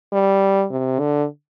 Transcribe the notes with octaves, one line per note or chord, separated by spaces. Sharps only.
G3
C3
D3